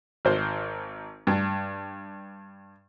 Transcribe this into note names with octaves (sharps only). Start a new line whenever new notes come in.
G#1 C5
G2